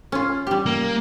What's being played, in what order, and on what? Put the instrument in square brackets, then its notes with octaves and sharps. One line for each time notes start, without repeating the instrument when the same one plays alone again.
[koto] C#4 F4
G3 G4
[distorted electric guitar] A#3